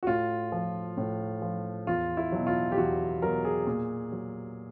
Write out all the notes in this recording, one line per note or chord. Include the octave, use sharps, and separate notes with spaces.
F#4
A2 F4
F3
A2
F3
E2 F4
E4
B2 F#3
F4
G4
E2 F#4
B2 F#3 A#4
G#4
A#2
F#3